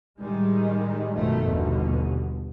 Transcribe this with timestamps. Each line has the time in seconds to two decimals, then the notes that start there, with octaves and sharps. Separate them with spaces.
0.19 A2 D#3 G3 G#3
1.15 G#1 F#2 B2 D#3 F3 A3
1.48 G1 D#2 B2 D3